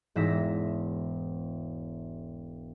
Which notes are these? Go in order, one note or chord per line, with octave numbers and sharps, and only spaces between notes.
E1 G#2 E5 A#6 B6